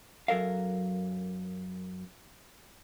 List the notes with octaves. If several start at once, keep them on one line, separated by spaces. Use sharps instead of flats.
F#2 F#3 A4 A#4 F5